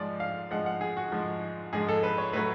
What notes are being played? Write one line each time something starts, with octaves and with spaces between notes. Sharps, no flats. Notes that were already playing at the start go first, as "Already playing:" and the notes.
Already playing: G#2 F3 G#3 D5
F5
G#2 F3 G#3 F#5
F#5
G#4
F#4
G#2 F3 G#3
G#2 F3 G#3 G#4
A4
B4
C#5
A2 F#3 A3 B4